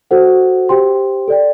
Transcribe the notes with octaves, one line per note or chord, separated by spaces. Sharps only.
F#4 A4 C5 F#5
G4 C5 G5 C6
A4 D5 G5